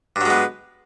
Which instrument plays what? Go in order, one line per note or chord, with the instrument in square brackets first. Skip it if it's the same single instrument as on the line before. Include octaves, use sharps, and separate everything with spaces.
[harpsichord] G2
F#3
G#3
B3